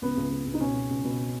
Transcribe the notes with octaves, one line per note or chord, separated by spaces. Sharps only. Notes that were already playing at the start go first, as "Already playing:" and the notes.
C#2 B3
C#2
C#2
C#2
D#4
B2 C#4
B2
C#2
B2